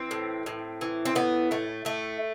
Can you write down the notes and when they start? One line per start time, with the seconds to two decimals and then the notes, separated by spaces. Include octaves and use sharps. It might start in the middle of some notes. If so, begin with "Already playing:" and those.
Already playing: E3 C4
0.11 A2
0.46 A2
0.81 E3
1.05 C4
1.15 A2 B3
1.51 A2 A3
1.85 A2 A3